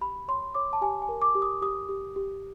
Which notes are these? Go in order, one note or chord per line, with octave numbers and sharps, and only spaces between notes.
G4 B5
C#5 C6
C#5 D6
A5
G4 G#5
G#5
A#4
D6
G4
D#6
G4 D#6
G4
G4